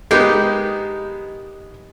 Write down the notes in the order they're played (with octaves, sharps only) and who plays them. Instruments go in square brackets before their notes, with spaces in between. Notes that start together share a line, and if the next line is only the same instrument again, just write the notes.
[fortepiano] G#3 A#3 B3 [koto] D#4 G4 G5